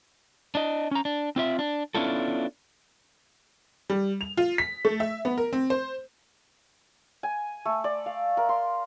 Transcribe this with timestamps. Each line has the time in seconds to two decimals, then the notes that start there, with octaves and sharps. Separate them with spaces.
0.55 D4 D#5
0.91 C#4 A#5
1.05 D4
1.36 C4 F4 E5
1.59 D4
1.95 B3 C#4 D4 E4 F4 A4
3.90 G3
4.21 F7
4.37 F4
4.58 B6
4.85 A3
5.00 E5
5.25 B3
5.38 A#4
5.53 C4
5.70 C5
7.23 G#5
7.65 A3
7.84 D5
8.06 F5
8.37 A#4
8.49 C6